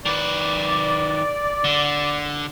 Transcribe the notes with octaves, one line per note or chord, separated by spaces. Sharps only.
D#3 B4 D5
D3